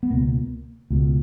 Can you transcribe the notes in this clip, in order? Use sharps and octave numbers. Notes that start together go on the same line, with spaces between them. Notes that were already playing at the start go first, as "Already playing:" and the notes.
B3
C#2 B2 A#3
C#2 B2